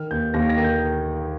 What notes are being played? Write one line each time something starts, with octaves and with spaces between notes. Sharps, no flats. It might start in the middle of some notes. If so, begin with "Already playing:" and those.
Already playing: D#3 F6
D#2 G6
D#2 A#6
A#6
D#3
G6